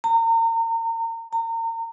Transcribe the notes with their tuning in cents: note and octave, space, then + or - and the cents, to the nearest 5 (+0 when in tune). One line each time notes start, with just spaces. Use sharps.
A#5 -35
A#5 -35